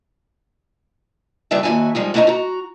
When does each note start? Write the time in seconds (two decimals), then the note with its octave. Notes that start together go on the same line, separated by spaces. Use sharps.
1.51 G2 C#3 G3 B4 E5 A5
1.63 D#2 A#2 E4 F#4 G#5
1.95 F3 G3 G#3 D#4
2.14 A3 D4 E4 C5 D#5 A#5
2.27 F#4 A#5